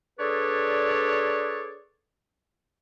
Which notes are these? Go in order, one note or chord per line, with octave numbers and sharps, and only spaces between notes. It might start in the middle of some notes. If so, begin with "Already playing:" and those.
D4 G#4 A4 B4 C#5 D5